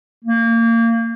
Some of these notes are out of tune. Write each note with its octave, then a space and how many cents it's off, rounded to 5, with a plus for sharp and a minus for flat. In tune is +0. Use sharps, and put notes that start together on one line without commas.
A#3 -25